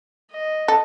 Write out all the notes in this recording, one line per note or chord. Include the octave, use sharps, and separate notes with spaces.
D#5
A4